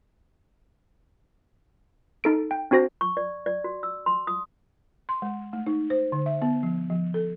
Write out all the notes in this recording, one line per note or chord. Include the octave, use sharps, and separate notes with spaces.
D#4 A4 D7
G5
C4 D4 F#4 C5 A#6
C#6
D5
D5
F#4
E6
C6
D#6
C6
G#3
A3
D#4
C5
D3
E5
B3
F3
F3
A4